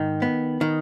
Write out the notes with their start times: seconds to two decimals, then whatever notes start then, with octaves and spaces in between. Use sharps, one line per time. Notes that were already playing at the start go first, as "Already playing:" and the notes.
Already playing: G#2 D#3
0.22 B3
0.61 D#3